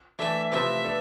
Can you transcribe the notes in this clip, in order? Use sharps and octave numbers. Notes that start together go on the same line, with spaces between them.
E3 A3 D4 A4 E5
C3 F3 A3 E4 B4 E5
B3 D4 A4